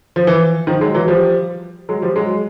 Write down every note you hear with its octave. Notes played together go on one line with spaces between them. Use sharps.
F3
E3
D#3 F3
F#3 G#3
E3 F#3
F3 G3
F#3 G#3
F3 G3
F#3 G#3